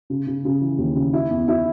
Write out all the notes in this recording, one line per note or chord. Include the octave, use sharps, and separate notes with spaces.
C#3
C#3
C#3
E3
D#2
C#3
E4
E2
E4